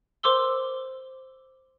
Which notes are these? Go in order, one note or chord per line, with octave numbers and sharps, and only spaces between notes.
A#4 C5 C6 D6 E6 G7